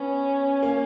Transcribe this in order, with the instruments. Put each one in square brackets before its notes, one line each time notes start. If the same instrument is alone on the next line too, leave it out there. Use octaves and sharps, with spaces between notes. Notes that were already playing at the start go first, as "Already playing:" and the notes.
Already playing: [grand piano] B3 [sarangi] C#4
[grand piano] A#3